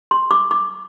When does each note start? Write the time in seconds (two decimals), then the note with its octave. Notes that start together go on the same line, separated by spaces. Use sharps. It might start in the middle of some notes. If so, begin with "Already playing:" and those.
0.11 C6
0.31 D6
0.51 D6